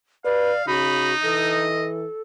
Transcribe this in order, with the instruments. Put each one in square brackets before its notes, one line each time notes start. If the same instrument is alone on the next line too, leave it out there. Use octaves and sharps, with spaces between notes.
[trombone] B4 [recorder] D5 [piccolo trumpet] F5
[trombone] C#3 [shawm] D#4 [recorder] F#4 [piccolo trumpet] B5
[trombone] E3 [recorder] A4 [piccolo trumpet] D#5